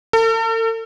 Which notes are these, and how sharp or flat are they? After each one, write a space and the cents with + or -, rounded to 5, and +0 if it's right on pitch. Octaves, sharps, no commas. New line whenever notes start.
A4 +45